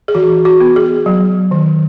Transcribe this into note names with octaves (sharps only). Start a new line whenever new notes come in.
G#4
E3 F#4
F#4
B3
G#4
F#3
D#3